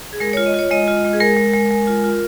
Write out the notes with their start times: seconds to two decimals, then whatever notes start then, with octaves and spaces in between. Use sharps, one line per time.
0.13 G#4
0.20 G#3 A#4
0.33 F4 C#5
0.46 D#5
0.54 F4 C#5
0.71 G#3 D#5
0.88 F4
1.05 G#3
1.13 G#4
1.20 G#3 A#4
1.37 G#3
1.54 G#3
1.71 G#3
1.87 F4
2.04 F4